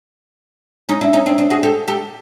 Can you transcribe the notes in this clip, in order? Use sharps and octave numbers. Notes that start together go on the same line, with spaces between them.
C#4 D#4
D4 E4
C#4 D#4
C4 D4
C4 D4
F#4 G#4
G4 A4
G4 A4